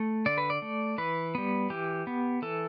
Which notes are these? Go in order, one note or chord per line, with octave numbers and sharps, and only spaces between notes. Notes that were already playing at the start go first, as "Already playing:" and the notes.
Already playing: A3
D3 D5
B4
D5
A3
E3 B4
G3 B3
E3 G4
B3
E3 A4